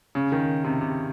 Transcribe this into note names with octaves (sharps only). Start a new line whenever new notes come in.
C#3
D#3
C3
C3